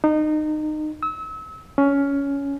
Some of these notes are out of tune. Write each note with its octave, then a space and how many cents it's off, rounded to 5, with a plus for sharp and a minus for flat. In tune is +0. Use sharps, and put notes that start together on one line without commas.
D#4 -25
E6 -35
C#4 +15